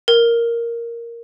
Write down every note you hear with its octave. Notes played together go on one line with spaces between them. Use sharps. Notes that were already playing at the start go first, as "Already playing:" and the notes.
A#4